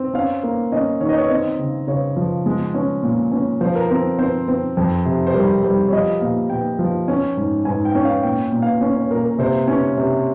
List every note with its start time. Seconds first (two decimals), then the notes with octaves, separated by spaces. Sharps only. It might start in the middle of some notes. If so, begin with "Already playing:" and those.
Already playing: C4
0.14 C#4 F5
0.43 A#3
0.72 C#4 D#5
1.00 D#3 C#5
1.09 D#5
1.17 C#5
1.30 C4 D#5
1.59 C#3
1.87 C#3 C#5
2.17 F3
2.46 G#3
2.74 C#4
3.03 A#2
3.32 C#4
3.61 F3 C5
3.75 A#4
3.90 C4 A#4
4.19 C4 C5
4.48 C4
4.77 F2
5.06 C3
5.27 C5
5.34 G3 A#4
5.64 G3 C5
5.88 C#5
5.92 F3 D#5
6.21 A#2 F5
6.50 A#2 G5
6.79 F3
7.08 C#4
7.37 G#2
7.65 G#2 G#5
7.85 G5
7.95 C#4
8.05 F5
8.23 A#2 G5
8.52 A#2
8.62 F5
8.81 C#4
8.96 C#5
9.11 A#2 A#4
9.25 A#4
9.39 C3 C5
9.68 C#4 C#5
9.98 C3